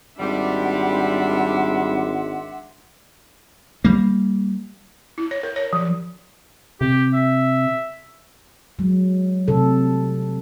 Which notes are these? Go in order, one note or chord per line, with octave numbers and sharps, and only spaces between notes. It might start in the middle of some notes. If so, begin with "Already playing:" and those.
G#1 G3 D4 E5 F#5 C6
G3 A#3
E4
C#5
A#4
C#5
F3
C3 G4
E5
F#3 G#3
C3 A4